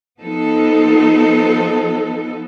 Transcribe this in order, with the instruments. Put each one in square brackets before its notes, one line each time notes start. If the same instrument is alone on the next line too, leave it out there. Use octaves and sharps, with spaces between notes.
[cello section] F3 B3 D#4 A4